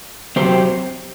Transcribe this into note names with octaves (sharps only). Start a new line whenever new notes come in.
F#3 C4 G4 C5